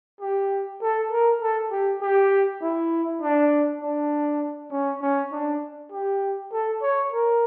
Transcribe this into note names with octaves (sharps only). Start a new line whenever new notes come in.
G4
A4
A#4
A4
G4
G4
E4
D4
D4
C#4
C#4
D4
G4
A4
C#5
A#4